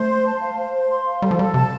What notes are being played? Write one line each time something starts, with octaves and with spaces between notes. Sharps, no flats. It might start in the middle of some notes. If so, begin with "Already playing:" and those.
Already playing: A3 C5
C6
A5
F5
C5
C5
C6
F5
G3 A4
F3
G3 A4
C3 A5